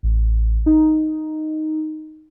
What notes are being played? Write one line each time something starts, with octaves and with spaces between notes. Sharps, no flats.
A1
D#4